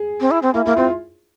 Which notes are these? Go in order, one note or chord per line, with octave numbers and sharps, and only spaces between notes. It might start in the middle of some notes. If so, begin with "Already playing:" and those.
Already playing: G#4
C4
E4
C4
A#3 E4
A#3 E4
C4 F4